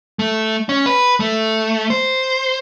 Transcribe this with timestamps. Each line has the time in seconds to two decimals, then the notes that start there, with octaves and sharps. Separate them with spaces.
0.19 A3
0.69 C#4
0.86 B4
1.20 A3
1.90 C5